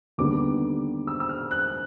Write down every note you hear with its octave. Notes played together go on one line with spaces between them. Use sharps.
D#2 D3 G3 B3 D6
E6
E6
F6
F#6